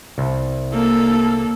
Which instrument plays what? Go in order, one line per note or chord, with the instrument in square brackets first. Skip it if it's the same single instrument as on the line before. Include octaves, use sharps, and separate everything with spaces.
[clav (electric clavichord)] C2
[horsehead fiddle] A#3 A4